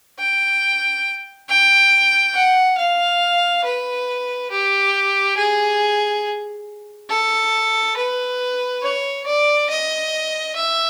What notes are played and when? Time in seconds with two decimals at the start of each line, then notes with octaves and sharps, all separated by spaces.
0.19 G5
1.49 G5
2.34 F#5
2.78 F5
3.64 B4
4.51 G4
5.37 G#4
7.10 A4
7.97 B4
8.82 C#5
9.26 D5
9.69 D#5
10.56 E5